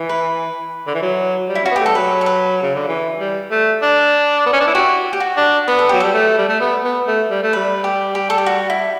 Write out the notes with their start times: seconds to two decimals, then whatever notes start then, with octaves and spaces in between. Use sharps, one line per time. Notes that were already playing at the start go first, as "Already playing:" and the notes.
Already playing: E3
0.09 B4
0.87 D3
0.95 E3
1.02 F#3
1.49 G3
1.55 E4
1.63 C#4 F#4
1.71 B3
1.76 A3 G4
1.86 G3 A4
1.95 F#3 B4
2.21 A4
2.26 B4
2.62 C#3
2.75 D3
2.88 E3
3.19 G3
3.51 A3
3.82 D4
4.46 B3
4.53 C#4
4.60 D4
4.67 E4
4.75 F#4 G4
5.13 G4
5.20 F#4
5.37 D4
5.68 B3 B4
5.79 A4
5.89 F#3 G4
6.00 G3 A4
6.14 A3
6.38 G3
6.49 A3
6.60 B3
6.84 B3
7.07 A3
7.30 G3
7.43 A3
7.53 G3 B4
7.84 G4
8.15 G4
8.30 A4
8.38 G4
8.46 F#4
8.70 E4